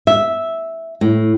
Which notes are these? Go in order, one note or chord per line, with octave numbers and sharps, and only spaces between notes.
E5
A2